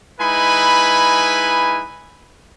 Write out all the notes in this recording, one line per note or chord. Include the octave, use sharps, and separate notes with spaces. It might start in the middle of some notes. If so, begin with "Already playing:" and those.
G#3 D#4 E4 B4 G#5 B5